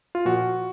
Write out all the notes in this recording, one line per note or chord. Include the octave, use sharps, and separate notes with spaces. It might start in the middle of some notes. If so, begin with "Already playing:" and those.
F4
A#2 F3 F#4